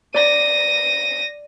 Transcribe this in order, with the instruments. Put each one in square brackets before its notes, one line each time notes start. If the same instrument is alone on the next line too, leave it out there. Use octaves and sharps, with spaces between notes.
[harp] D5 [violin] A#6 D#7